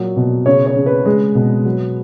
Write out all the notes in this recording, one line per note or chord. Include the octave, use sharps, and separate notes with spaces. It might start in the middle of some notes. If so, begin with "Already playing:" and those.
Already playing: A#2 F#3
B2
C#3 C#5
C#5
C#3
B4
G#3
B2
F#3